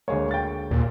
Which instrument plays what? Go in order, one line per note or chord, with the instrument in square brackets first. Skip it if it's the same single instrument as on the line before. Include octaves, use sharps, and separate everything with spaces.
[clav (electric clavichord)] D2 G#3 A#3 [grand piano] C#5
[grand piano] G5 A6
[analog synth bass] D#2 [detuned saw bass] A#2